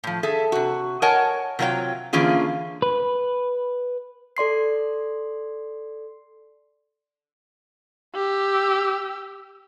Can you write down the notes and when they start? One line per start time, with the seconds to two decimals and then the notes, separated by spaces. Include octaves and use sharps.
0.04 A2 F3
0.23 G#4 A4 E5
0.52 C3 F#4
1.02 A#4 C#5 D#5 F#5 G#5 A5
1.59 C3 F#3 F4 A#4 C#5 G5
2.13 D3 E3 A#3 C#4 F4 G#4
2.82 B4
4.37 A4 D5 C6 C7
8.15 G4 E6